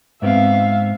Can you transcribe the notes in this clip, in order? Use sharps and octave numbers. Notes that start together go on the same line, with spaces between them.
G#2 B3 C4 E5 F5